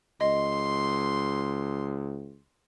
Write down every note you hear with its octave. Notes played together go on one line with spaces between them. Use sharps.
C#2 D#5 C6